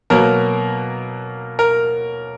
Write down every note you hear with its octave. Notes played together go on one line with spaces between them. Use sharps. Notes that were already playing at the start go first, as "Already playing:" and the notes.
B2 F#3 A#3 A#4
A#4